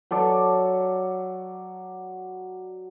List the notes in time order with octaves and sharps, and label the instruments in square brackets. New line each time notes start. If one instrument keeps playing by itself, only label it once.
[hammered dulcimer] F#3 A4 D5